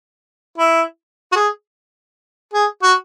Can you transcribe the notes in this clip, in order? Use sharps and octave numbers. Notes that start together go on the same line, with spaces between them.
E4
F#4
G#4
G#4
F#4